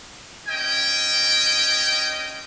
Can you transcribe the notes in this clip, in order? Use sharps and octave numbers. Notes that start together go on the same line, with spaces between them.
C#4 D#5 G5